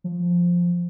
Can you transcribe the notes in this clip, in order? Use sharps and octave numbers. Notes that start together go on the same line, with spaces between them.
F3